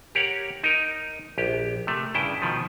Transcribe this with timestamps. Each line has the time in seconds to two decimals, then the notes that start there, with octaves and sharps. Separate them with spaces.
0.15 G4 A#4 C#5 F#5
0.63 D#4 A#4
1.38 A#1 G4
1.87 C3 A3
2.14 G2 C#3 E4 G5
2.42 B2 D#3 F3